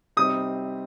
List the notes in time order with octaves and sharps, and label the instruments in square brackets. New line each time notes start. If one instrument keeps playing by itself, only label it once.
[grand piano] C3 G3 C4 D#4 [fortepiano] D#6